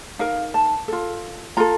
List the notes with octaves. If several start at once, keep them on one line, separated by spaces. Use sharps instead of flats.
D#4 A#4 F5
A5
F4 A4
F4 A4 A#5